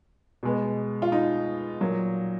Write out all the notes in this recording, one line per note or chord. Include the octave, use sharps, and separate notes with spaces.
B2 G#3 B3
F4
D#4
A#2 F#3 A#3